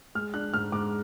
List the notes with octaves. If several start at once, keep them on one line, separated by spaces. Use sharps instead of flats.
G#3 F6
D4 F#6
G#2 F6
G#2 D6